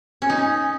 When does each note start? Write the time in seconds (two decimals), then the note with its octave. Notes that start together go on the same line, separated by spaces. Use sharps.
0.22 C#4
0.30 D#4
0.37 C#4